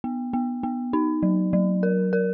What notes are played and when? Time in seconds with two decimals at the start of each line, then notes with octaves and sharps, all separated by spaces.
0.04 B3
0.33 B3
0.63 B3
0.93 D#4
1.23 F#3
1.53 F#3
1.83 A#4
2.13 A#4